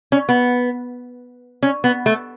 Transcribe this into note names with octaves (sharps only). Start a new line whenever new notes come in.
C#4
B3
C#4
B3
A3